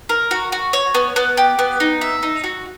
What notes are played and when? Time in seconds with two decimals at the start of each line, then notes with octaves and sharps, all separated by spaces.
0.09 A#4
0.31 F#4
0.52 F#4
0.73 C#5
0.95 B3
1.16 B3
1.37 G4
1.59 B3
1.80 D#4
2.01 E5
2.23 D#4
2.44 F#4